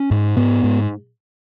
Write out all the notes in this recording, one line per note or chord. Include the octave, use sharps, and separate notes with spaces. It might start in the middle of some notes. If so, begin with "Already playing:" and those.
Already playing: C#4
G#2
G#2 B3
G#2